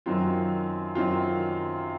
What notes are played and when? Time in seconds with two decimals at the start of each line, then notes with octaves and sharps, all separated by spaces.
0.06 F#2 D#3 F#3 C4 F4
0.95 F#2 D#3 F#3 C4 F4